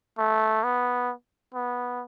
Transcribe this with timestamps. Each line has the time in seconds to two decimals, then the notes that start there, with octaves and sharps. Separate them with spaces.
0.18 A3
0.64 B3
1.55 B3